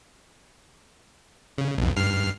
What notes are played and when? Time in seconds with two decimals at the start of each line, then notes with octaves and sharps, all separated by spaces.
1.58 C#3
1.78 B1 F2
1.96 G2 F6 C7